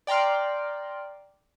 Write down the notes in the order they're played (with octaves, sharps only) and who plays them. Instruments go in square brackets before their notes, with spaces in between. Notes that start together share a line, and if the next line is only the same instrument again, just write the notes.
[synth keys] D5 G5 A#5 C6 F6